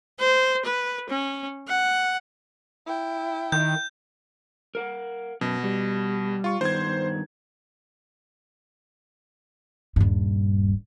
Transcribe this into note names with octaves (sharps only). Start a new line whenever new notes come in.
C5
B4
C#4
F#5
E4 G5
D#3 G6
A#4 F5 F#5
F#2 B2
G3
F4 C#6
G2 D#3 B3 C5 G#6
D#1 G2